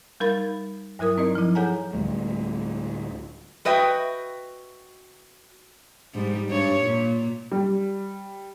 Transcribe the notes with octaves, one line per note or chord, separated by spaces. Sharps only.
G3 D#4 A#4 F5 B5 A6
G2 F#3 E4 A#4 D#6
C4 D#4 A#4 D5 D#5
F3 E4
G#4 A4 C#5 F#5 G#5 A#5
D2 A2 G3 A3
F#4 B4 D#5 E5 G5
G#2 G3
G2 C#5
A#2
G3